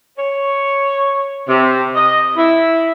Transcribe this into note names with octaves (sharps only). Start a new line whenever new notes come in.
C#5
C3
D#5
E4